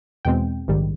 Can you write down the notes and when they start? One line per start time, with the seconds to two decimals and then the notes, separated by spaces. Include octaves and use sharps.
0.25 E2 B2 G#3 C4 G5
0.68 A#1 G#2 D#3 G3